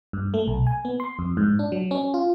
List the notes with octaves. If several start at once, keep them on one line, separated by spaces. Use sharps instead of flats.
G2
A3
B1
G#5
B3
C6
F2
G#2
D4
F#3
C#4
F4